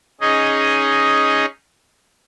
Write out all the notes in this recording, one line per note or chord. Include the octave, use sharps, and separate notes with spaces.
C#4 D#4 G#4 D#5